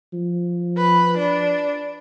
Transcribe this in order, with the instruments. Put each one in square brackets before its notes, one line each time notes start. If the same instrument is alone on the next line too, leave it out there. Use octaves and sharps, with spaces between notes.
[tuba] F3
[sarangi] B4
D4